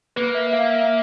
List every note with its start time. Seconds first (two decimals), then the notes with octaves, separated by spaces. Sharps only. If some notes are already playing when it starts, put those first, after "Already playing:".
0.16 A#3 B4
0.35 E5
0.47 E5
0.53 F5
0.70 E5
0.81 E5